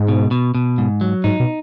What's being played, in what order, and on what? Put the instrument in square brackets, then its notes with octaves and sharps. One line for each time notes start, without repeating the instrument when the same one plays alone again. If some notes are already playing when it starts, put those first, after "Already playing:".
Already playing: [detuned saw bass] G#2
[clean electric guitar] B2
B2
B2
G#2
F#3
[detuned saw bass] G#2 [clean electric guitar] D#4
[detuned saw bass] B2